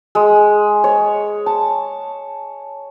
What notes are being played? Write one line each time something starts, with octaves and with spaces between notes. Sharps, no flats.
G#3
C#5
A5